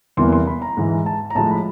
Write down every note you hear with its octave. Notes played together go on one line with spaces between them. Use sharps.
E2 C3 E3 G3 A#3 C6
C6
B5
A#5
G#2 E3 G#3
A5
A#5
A2 F3 G#3 A5
B5